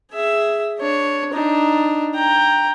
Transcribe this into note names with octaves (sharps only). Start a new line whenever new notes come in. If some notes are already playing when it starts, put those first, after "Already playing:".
G#4 E5
D4 C#5
D4 D#4
G5 A#5